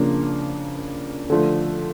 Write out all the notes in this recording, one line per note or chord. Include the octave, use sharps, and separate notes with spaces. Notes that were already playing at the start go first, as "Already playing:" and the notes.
Already playing: C#3 F3 A#3 D4
D3 F3 A3